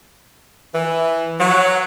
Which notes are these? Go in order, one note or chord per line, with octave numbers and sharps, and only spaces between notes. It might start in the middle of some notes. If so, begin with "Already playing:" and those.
E3
F#3